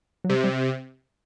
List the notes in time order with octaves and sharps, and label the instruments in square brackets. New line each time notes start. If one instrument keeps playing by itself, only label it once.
[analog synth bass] F#3
[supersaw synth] C3 [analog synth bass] G3
[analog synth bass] G3